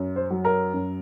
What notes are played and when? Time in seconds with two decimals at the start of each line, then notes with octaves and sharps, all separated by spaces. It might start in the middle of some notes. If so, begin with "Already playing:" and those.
Already playing: F#2
0.16 C5
0.30 F#3
0.45 A#4
0.74 F#2